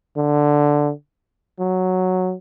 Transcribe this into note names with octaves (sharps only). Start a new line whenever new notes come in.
D3
F#3